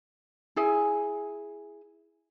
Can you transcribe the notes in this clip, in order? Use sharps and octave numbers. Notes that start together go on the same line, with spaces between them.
E4 G#4 G#5